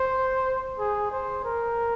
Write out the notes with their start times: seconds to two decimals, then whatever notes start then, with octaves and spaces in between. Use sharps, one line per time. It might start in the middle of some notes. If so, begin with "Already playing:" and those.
Already playing: C5
0.79 G#4
1.11 C5
1.45 A#4